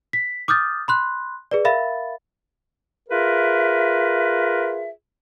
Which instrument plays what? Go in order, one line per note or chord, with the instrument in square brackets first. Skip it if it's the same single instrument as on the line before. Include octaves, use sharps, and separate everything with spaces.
[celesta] B6
D6 D#6 F6 G6 A6
B5 C6 F#6
G#4 B4 D5
A#4 E5 F5 B5 A6
[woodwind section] F4 G#4 A#4 B4 E5